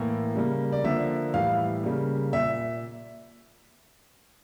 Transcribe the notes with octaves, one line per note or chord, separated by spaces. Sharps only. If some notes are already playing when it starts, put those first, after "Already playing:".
Already playing: A2 E3 A#3
C#3 G3 A#3
D5
D3 F3 A#3 E5
A2 E3 G3 F5
C#3 G3 A#3
A#2 E5